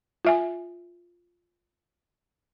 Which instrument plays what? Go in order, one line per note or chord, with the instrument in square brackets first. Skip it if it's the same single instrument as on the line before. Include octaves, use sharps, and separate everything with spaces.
[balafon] F4 E5 G#5